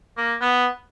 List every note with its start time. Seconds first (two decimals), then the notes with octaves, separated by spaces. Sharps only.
0.17 A#3
0.41 B3